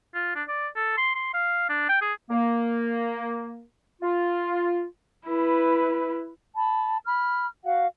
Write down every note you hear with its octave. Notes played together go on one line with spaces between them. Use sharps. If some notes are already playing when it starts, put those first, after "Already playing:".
F4
D4
D5
A4
C6
C6
F5
D4
G5
G#4
A#3
F4
E4 B4
A5 B5
B5 F6
F#4 F5 F#5